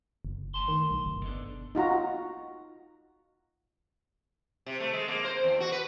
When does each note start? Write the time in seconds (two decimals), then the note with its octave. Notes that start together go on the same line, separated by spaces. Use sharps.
0.25 F#1
0.54 D2 A5 C6
0.68 D#3
0.91 B1
1.06 G1
1.23 B2 D3
1.75 D#4 F4 F#4 A#5
4.66 C3
4.80 A3
4.93 G#3
5.08 A#3
5.25 C5
5.44 E2
5.60 F#4
5.72 B4